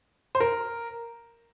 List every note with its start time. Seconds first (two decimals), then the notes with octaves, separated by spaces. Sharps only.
0.35 C5
0.40 A#4